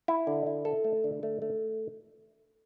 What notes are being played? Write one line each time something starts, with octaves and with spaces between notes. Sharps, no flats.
E4
D3
E4
A4
A3
D3
A3
A3